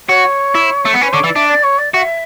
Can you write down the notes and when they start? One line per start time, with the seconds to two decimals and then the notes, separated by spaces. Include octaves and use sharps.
0.08 F#4 C#5
0.55 E4
0.85 A3
0.94 B3
1.01 C#4 B4
1.13 D3 C#5
1.24 E3 D5
1.36 D4 E5
1.48 D5
1.63 C#5
1.78 D5
1.93 F#4 E5